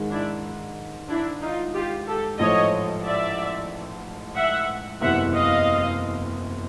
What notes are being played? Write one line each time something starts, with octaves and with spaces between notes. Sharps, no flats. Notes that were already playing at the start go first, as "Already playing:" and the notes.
Already playing: G#2 D#3 G#3
D4 E4
D4 E4
D#4 F4
F4 G4
G4 A4
A1 G#2 F3 A3 C#5 D#5
D5 E5
E5 F#5
F#1 E2 C3 E3 E5 F#5
D#5 F5